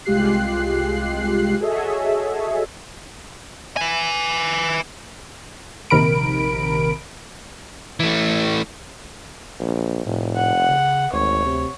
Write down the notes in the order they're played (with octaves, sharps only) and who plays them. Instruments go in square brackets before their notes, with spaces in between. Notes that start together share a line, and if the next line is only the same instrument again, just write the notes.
[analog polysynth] C2 G#3 F4 G4 F#6 C7
F#4 G#4 A4 C#5 D#5 E5
[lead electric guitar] B4 G#5
[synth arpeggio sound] A#1 C3 D#3 A#4 B5 D7
[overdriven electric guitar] E3 A3
[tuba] A#1
[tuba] F1 [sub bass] A2
[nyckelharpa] F#5
[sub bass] C#3
[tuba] G#1 [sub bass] D2 [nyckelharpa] C#5
[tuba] C3